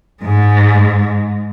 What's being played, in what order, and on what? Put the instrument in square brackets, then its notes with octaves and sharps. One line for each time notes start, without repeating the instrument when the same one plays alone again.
[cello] G#2 G#3